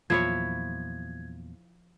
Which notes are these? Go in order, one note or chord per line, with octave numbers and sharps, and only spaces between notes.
E2 A#2 F3 F#3 E4 C#5 G#6